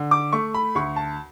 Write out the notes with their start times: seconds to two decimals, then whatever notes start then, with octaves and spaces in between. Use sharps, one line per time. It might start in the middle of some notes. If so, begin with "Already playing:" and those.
Already playing: D3
0.11 D6
0.32 A3 C#6
0.54 B5
0.75 D2 C#6
0.96 A5